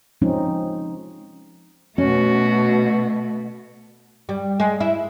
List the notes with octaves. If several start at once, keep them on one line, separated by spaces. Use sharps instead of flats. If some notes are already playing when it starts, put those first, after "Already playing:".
F3 G#3 C4 C#4 D#4
B2 A3 C#4 F#4
G3
G#3
E4